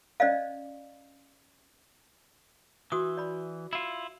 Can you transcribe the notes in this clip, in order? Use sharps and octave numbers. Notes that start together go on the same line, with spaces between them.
C#4 D5 D#5 F5
E3 F#4 D#6
D5 B5
E4 F4